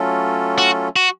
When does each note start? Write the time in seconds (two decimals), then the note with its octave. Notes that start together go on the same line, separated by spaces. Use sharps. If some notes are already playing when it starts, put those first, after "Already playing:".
Already playing: F#3 A3 C#4 F4 A4
0.58 F#4
0.96 F#4